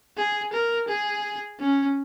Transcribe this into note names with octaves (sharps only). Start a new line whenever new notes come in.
G#4
A#4
G#4
C#4